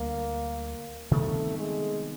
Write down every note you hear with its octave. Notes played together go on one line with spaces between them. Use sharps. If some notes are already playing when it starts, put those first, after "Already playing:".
Already playing: D2 D3 G3 A#3
C3 D#3 G3 A3 B3
G#3